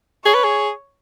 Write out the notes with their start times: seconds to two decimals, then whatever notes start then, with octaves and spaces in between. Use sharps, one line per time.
0.25 G#4 C#5
0.34 B4
0.44 G#4